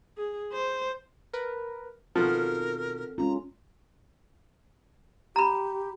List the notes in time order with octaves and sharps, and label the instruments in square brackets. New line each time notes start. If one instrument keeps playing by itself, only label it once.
[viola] G#4
C5
[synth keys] A#4 B4
[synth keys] B2 D#3 F#4 [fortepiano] F3 [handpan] C4 A4 [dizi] A#4
[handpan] G#3 C#4 F4 [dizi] A#5
[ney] G4 [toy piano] A#5 B5